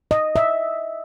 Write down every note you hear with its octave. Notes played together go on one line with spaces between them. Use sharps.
D#5
E5